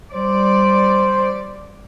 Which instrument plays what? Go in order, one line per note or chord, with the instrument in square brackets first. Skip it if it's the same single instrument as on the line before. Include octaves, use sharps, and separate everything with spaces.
[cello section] G3 D5 [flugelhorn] C5